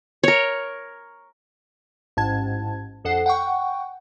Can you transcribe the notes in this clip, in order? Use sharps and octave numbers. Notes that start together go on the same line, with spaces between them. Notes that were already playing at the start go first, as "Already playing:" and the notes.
A#4 C#5
A1 G#2 A5 G#6
A#1 F2 A4 F#5 C7
F#5 G5 C#6